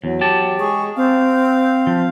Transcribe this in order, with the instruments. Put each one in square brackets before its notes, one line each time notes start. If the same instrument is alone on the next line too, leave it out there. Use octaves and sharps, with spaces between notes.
[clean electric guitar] E2 [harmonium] F#3
[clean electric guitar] G4 A5
[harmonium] G#3 G#4 [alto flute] C#6
[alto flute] C4 [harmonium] F5
[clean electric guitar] F3